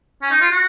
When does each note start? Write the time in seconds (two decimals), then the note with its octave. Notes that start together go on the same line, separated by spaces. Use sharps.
0.22 C#4
0.30 D#4
0.41 F4
0.51 F#4